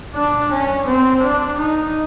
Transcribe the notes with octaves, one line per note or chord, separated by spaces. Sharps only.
D4
C#4
C4
D4
D#4